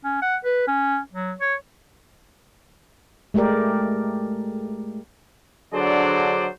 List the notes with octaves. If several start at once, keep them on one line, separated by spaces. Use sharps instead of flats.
C#4
F#5
B4
C#4
F#3
C#5
G#3 A3 G4 A#4 D5
D3 F#3 D4 G#4 C5 D5